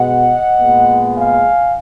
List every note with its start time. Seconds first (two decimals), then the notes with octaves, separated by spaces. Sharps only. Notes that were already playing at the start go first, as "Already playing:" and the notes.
Already playing: B2 G#3 B3 D#5 F#5
0.59 A#2 G#3 B3
1.16 F5 G#5